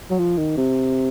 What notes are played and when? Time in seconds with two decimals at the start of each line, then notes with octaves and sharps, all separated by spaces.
0.10 F#3
0.19 F3
0.38 D#3
0.57 C3